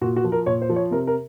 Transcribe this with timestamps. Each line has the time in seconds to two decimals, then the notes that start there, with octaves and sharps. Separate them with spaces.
0.01 A#2 F#4
0.16 F#4
0.24 F3
0.32 A#4
0.46 A#2 C#5
0.62 C5
0.69 F3
0.76 C#5
0.91 C3 A#4
1.07 A#4